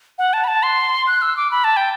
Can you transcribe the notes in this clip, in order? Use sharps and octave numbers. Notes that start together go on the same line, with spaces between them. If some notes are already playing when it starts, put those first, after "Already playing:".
F#5
A5
B5
A5
C6
F#6
E6
D6
B5
A5
G5